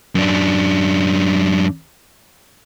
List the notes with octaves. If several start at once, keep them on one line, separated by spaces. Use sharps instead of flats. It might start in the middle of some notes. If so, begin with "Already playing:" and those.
F#2 D4